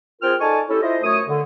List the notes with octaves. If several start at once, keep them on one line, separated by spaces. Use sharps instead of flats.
C4 F4 G#4 A#4 G5 F6
D#4 A4 D5 G#5 A5 C#6
C#4 E4 G4 A4
E4 F4 C5 D#5
F#2 A3 C#5 D#6
D3